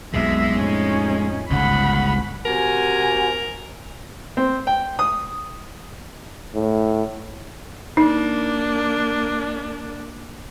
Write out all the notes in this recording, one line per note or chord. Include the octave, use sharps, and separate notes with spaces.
B1 F2 B2 G#3 E5
F2 A2 C#4 D#4
G1 C#2 G#2 C#3 F#5 B5
C3 F#4 A#4 G#5
C4
G5
D#6
A2
A#3 D4 D#4